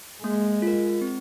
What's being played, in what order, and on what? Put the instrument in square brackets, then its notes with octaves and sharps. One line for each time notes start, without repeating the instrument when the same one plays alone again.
[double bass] G#3 [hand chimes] A#3
[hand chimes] F4 A#4
C4